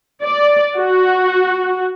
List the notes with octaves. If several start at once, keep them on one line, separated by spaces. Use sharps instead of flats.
D5
F#4